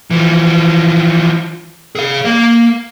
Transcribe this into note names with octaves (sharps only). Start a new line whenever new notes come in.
E3 F3
G#4 F5
A#3 F5